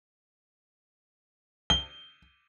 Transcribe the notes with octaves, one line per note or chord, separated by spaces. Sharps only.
G7